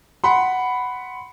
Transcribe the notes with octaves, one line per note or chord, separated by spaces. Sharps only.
F#5 B5 C6